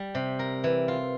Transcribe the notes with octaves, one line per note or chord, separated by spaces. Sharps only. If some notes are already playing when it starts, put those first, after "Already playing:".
Already playing: G3
C3
A#4
E3
F4